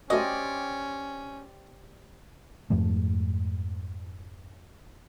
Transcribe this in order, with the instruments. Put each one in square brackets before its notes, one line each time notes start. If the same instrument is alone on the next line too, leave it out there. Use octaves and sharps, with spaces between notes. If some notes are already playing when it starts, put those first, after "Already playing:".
[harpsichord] A3 F#4 [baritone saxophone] C#4 [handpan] G4 C5 D5 [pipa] D#5
[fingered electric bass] F2 G#2 F3 A3